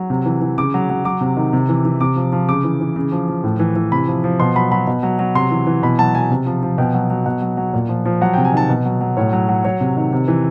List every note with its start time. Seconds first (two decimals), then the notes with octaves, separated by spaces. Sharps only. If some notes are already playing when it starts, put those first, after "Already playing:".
Already playing: F#3
0.10 C3
0.26 E3
0.42 E3
0.58 C#3 D6
0.74 F#3
0.89 F#3
1.05 F#3 D6
1.21 C3
1.37 D#3
1.53 C3
1.69 E3
1.85 E3
2.00 C3 D6
2.16 F3
2.32 F3
2.49 C#3 D6
2.64 E3
2.81 E3
2.96 C#3
3.12 F3
3.28 F3
3.44 A2
3.60 E3
3.76 E3
3.92 C3 B5
4.08 F3
4.24 F3
4.40 B2 C6
4.55 F#3 B5
4.71 F#3 B5
4.87 B2
5.03 F#3
5.19 F#3
5.35 C3 C6
5.51 E3
5.67 E3
5.83 B2 B5
5.99 F#3 A5
6.15 F#3 G#5
6.31 C3
6.46 F3
6.63 F3
6.78 B2 G5
6.94 F#3
7.10 F#3
7.26 B2 F#5
7.42 F#3
7.57 F#3
7.74 A#2
7.89 F3
8.06 F3
8.21 F#3 F#5
8.34 C3 G5
8.45 G#5
8.53 D#3 A5
8.70 B2
8.85 F#3
9.01 F#3
9.17 A2 C#5
9.33 F#3
9.49 F#3
9.64 F#3 C#5
9.81 C3
9.97 D#3
10.13 C3
10.28 E3